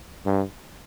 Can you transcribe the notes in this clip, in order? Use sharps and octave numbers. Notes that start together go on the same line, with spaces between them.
G2